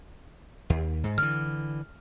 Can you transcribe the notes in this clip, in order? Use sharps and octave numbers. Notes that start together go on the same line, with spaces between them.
D#2
G#2
D3 E3 F6